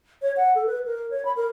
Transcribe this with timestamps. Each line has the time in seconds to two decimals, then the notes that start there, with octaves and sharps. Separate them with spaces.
0.22 C#5
0.37 F#5
0.55 A4
0.67 B4
0.86 A#4
1.11 C#5
1.25 B5
1.36 A#4